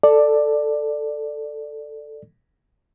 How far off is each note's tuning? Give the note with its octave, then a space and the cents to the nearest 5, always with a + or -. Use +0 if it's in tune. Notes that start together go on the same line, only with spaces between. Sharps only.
A4 +5 D5 +10